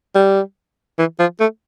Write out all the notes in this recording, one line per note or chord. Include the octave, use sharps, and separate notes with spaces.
G3
E3
F3
A3